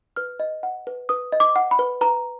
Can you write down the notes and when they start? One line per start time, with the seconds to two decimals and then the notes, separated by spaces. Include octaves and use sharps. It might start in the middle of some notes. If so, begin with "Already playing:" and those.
0.16 B4 F6
0.40 D#5
0.63 F#5
0.87 B4
1.09 B4 D#6
1.32 D#5
1.40 D6
1.56 F#5
1.71 B5
1.79 B4
2.01 B4 A#5